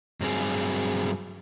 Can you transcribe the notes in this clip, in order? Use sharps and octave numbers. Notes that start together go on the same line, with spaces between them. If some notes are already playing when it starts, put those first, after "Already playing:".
G2 F#3 C4 G#4